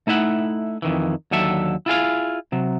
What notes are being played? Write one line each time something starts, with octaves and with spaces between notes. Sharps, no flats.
A3 D#4 E4 E5 F#5
F2 D#3 E3
D#2 D3 F#3 A4 E5
E4 F4 G#4 F5
C3 F#3